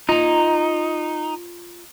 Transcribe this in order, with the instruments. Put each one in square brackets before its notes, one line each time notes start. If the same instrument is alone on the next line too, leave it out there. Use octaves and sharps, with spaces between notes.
[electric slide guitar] D#4 [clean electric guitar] F4 A#5